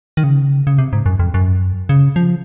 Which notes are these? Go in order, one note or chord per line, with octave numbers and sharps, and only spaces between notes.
D#3
C#3
C#3
C3
G#2
F#2
F2
F#2
C#3
F3